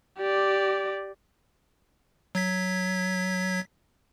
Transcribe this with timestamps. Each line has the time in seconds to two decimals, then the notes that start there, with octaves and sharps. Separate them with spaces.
0.18 G4 D5
2.35 F#3 G#6 B6